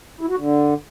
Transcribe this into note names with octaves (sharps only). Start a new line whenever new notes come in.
E4
F#4
D3